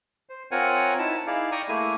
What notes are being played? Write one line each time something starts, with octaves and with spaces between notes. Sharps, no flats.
C5
C4 F4 A#4 C#5 F#5 G#5
D#4 E4 A5
D#4 E4 G#4 D5 F5
D5 G5 A#5 C#6 D#6
A3 A#3 E4 G#4 G#5